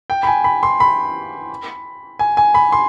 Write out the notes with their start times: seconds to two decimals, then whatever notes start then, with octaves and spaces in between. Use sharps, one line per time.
0.10 G5
0.23 B5
0.27 G#5
0.44 B5
0.63 C6
0.80 B5
2.19 G#5
2.37 G#5
2.54 B5
2.72 C6